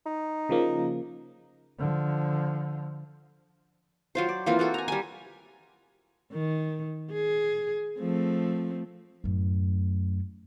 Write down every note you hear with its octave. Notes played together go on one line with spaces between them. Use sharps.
D#4
C#3 F3 A#3
D3 F3
F#3 F4 C5
D5
E3 A#3 C4 F4
A#3 F#4 A4
G#5 A#5
G3 G#5
D#3
G#4
F3 A3 C4
F#2 A2